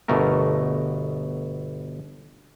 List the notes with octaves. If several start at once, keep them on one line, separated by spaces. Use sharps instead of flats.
G1 B2 A3 A#4